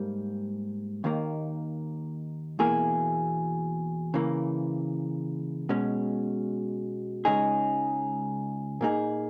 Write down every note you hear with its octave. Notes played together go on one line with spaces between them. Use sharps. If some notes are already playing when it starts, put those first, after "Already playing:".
Already playing: G#2 G3 A#3
D#2 D#3 A#3
E2 B2 A#3 E4 G#4
C#3 E3 A#3
B2 G#3 C#4
C#2 C#3 G#3 D#4 G#4
A#2 A#3 D#4 G#4